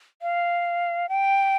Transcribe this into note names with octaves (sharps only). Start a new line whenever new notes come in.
F5
G5